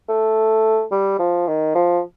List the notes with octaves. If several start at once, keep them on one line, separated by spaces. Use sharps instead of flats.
A3
G3
F3
D#3
F3